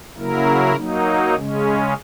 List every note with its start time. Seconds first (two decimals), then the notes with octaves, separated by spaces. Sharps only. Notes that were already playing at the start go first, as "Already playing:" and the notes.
0.16 C#3 F#3 A#3 E4 A#4
0.75 F#3 A#3 D#4
1.34 C#3 G#3 C#4